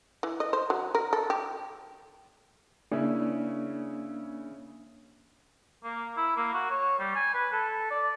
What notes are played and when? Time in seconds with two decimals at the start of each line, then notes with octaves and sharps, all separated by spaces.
0.23 E3
0.40 D#5
0.53 C5
0.70 F#3
0.95 A#4
1.13 A4
1.30 G4
2.92 C#3 A#3 C#4 D4 E4
5.84 A#3
6.17 E4
6.37 A#3
6.53 F#4
6.70 C#5
6.99 G3
7.15 G#5
7.34 B4
7.52 A4
7.91 D5